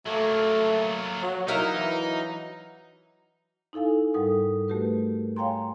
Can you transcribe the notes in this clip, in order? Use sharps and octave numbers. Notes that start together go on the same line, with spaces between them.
F#3 A3 A#3
F#3
F#3 D#4 E4 A#4 F5
E3
D#4 E4 A4 F5 G#5
G#2 G3 A4 A#4 F#5 D#6
A3 F#4 G4 A#4 B4
C#5 F5 G5 G#5 A#5 C6